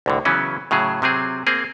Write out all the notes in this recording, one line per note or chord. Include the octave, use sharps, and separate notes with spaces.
C2 A2 D3
C#3 E3 F#3 B3 C#4
A2 C#3 F#3 G#4
C3 F#3 C4 G#4
A#3 C4 G#4